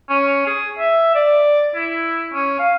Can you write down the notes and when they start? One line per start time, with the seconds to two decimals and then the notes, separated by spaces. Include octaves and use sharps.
0.09 C#4
0.47 G#4
0.79 E5
1.15 D5
1.75 E4
2.33 C#4
2.59 F5